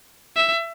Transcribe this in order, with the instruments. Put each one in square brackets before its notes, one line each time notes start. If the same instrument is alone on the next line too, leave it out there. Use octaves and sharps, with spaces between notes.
[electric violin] E5